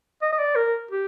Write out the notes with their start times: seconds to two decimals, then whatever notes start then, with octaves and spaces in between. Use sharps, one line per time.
0.22 D#5
0.33 D#5
0.39 D5
0.56 A#4
0.91 G4